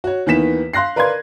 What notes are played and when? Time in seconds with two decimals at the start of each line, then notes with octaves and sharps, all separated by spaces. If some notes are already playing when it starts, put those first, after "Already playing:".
0.04 F#4 C#5
0.26 D#2 D#3 E3 B3 B6 E7
0.73 F5 C6 F#6 A#6 C7
0.96 A#4 B4 D5 F5 C6 G#6